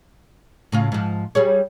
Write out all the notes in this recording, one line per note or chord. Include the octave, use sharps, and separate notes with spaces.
A2 C#3 F4
G#2 F3
G3 G#4 C#5